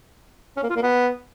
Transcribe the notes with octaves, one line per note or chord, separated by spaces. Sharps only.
C#4
A#3
F4
A#3
B3